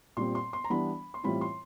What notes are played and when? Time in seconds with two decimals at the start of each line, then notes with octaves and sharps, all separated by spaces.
0.17 A#2 G3 C4 C6
0.35 C6
0.53 C6
0.64 A#5
0.70 E3 G3 B3 D4 B5
1.14 C6
1.23 A2 E3 G3 C4 F4 B5
1.41 C6